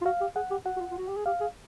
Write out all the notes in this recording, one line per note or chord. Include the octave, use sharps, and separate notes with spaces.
F4
F#4 F5
G4
G#4 F#5
G4
F#4 F#5
F#4
F4
F4
F#4
G4
G#4
G4 F5
G#4